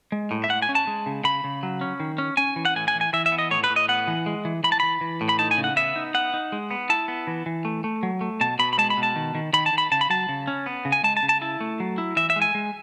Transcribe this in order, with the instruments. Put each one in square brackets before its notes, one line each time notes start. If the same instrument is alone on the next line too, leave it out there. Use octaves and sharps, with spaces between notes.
[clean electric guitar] G#3
A2
E5
A2 F#5
G#5
C#4
A5
G#3
C#3
C#3 B5
C#3
F#3
C#4
D#3
C#4
C#4 G#5
E3
F#5
A2 G#5
G#5
E3
G#5
E3 E5
E5
B3
D#5
A2 C#5
B4
A2
D#5
B3 F#5
E3
G#3
E3
E3 B5
A5
E3 B5
E3
A2
B5
D#4 A5
G#5
C#3
F#5
B3 E5
D#4
B3 F#5
D#4
G#3
B3
E4 A5
B3
E3
E3
A3
A3
F#3
A3
B2 A5
B2 B5
B5
G#3 A5
B5
B2
A5
D#3
D#3
D#3 B5
A5
D#3
B5
C#3 A5
B5
F#3 A5
C#3
C#4
B3
C#3
G#5
G#3 A5
A5
C#3
A5
E4 A5
A3
F#3
E4
E3 E5
E5
G#3
G#5
G#3